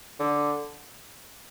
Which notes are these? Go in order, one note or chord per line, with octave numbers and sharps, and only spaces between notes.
D3